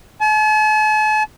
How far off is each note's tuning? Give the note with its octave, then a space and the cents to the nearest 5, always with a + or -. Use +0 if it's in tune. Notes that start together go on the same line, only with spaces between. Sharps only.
A5 -45